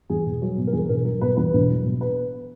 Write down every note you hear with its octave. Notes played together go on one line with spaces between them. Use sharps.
E2 G#4
E1
F#3
B2
A#4
E2 G#4
E1 A#4
F#3 A#4
B2 B4
E2 B4
E1
F#3
B2
B4